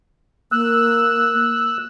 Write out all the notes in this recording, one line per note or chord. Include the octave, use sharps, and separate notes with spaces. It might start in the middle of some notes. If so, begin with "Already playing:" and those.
A#3 E6 F#6